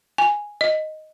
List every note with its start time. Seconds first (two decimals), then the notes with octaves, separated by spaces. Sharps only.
0.18 G#5
0.61 D#5